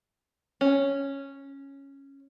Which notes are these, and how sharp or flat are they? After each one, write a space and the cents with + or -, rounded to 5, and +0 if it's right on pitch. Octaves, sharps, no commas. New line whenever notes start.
C#4 -5